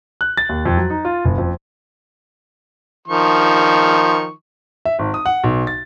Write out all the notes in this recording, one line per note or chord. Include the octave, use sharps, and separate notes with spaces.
F#6
A6
D#2
F2
F#3
D#4
F4
F#1
F2
D#3 F3 C#6
E5
G#1
D#6
F#5
B1
A6